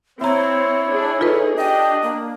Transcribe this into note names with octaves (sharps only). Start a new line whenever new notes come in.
C4 E4 C#5 E5 A#5
D4 G#4
D#4 F4 G#4 A4 B4
D4 G4 D#5
A#3